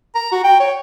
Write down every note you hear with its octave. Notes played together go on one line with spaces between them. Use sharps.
A#5
F#4
G5
C#5